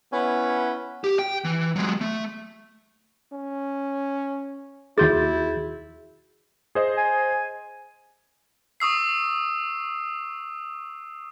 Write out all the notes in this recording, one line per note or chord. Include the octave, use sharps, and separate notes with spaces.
B3 C#4 E4 B4
G4
G5
E3
F#3 G#3
A3
C#4
D#2 E4 F#4 G#4 G6 A6
G#4 C5 D#5
G#5
C#6 D#6 E6 C7